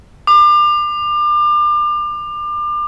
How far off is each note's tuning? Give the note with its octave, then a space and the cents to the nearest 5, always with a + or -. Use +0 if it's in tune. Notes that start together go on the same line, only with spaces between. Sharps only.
D6 +30